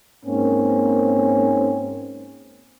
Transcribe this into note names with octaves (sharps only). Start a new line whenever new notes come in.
G#2 A#3 C4 C#4